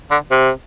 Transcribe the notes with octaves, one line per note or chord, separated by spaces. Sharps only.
D3
C3